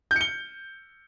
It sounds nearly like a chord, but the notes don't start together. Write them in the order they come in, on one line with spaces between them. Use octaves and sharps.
G6 C#7 G7